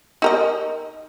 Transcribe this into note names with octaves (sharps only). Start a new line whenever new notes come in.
D#4 A#4 D#5